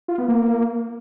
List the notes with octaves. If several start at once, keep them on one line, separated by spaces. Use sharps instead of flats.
F4
B3
A#3